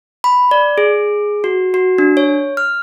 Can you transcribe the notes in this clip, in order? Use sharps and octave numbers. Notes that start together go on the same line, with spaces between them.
B5
D5
G#4
F#4
F#4
D4
C#5
F6